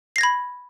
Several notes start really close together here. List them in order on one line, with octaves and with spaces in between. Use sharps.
C7 A#6 G#6 B5